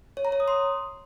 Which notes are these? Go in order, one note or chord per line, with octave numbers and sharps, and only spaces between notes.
C#5
A#5
C#5
D#6
C6